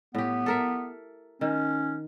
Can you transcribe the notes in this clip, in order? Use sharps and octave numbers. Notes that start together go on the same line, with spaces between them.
A2 B3 G4
A4 A#4 E5
D#3 C#4